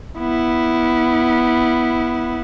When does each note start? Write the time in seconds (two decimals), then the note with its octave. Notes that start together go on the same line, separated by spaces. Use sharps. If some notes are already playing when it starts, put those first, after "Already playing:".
0.19 B3 E4